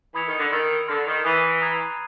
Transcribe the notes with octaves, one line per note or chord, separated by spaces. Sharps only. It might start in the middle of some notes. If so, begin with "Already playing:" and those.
E3 B5 D#6 G#6 C#7 F7
D#3
D3
D#3 B5 E6 A6
D3 C6 F6 A#6
D#3
E3 D#6 F#6 A6 C7 D#7
A#5 D#6 G#6 C7